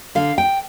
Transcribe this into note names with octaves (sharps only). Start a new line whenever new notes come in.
D3 F5
G5